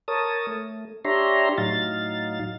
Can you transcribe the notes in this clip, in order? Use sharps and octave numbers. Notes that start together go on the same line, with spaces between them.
A#4 C#5 A5 D#6
A3
D4 G4 C#5 E5 A#5 C6
A2 F#3 D#4 F5 A6